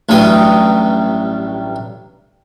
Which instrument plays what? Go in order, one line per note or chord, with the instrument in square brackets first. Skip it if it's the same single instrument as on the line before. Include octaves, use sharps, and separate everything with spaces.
[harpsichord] A1 G2 F#3 G3 D#6